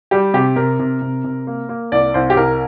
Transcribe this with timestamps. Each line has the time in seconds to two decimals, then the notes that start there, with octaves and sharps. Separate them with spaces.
0.11 G3 G4
0.34 C3 G4
0.56 C3 A#4
0.80 C3
1.02 C3
1.24 C3
1.47 A#3
1.69 A#3
1.92 C2 D5
2.14 C2 C5
2.30 G4
2.37 C2 A#4